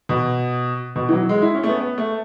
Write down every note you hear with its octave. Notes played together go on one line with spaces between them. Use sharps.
B2
B2
E3
F#3
G#3
E4
C#4
A3
B3
B3
A3